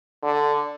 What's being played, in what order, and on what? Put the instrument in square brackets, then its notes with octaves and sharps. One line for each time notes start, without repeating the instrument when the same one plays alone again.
[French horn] D3